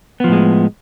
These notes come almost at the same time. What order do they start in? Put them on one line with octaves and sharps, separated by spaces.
B3 F3 A2 G#3